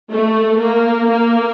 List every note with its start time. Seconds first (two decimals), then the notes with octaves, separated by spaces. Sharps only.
0.11 A3
0.59 A#3
1.08 A#3